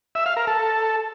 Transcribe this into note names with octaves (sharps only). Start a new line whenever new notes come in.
E5
F5
A#4
A4